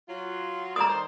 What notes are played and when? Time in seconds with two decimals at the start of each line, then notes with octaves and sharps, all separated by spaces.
0.09 F#3 F4
0.76 A3 A#3 D5 A#5 D#6
0.89 D#3 C5